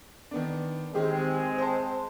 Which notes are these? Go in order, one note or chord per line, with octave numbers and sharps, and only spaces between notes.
D#3 B3 D4
D#3 G#3 C4 G4 G#4
C5 A5